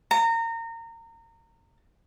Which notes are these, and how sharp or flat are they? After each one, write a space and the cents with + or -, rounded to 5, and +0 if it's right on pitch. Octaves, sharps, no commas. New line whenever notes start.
A#5 -25